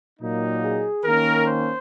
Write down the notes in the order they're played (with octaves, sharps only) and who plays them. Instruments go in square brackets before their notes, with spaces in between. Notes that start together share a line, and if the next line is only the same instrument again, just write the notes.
[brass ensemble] A#2 F#3 A#3 D#4
G#4
D#3 A#3 C#4 A#4
C5